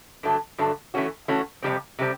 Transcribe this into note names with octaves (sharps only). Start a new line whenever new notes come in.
G2 D3 F#3 A3
G2 D3 F#3 A3
E3 A3 C#4 F#4
E3 A3 C#4 F#4
F2 C3 D#3 G3 C4
C3 G3 C4